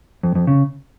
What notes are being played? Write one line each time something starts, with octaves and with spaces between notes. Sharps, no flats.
F2
F2
C#3